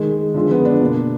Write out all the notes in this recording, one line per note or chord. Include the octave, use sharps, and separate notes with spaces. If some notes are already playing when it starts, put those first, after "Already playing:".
Already playing: D#3 G#3
D3 F3 G#3
B3
D4
B2 A#3